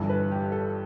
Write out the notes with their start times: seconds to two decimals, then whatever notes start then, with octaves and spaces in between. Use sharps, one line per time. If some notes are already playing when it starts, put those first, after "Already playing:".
Already playing: G1 G2 E3 A4
0.10 B4
0.32 G4
0.52 A4